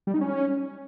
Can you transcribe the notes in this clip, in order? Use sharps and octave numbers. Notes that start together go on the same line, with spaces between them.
G3
D#4
C#4